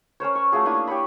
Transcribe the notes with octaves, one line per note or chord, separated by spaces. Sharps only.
C#4 A#4 C5 C#5
C#6
A3 F4 F#4 G#4
A#3 D4 E4 G#5
G4 C#5 B5